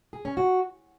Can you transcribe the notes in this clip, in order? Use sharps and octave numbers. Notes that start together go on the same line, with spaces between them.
G#4
C#4
F#4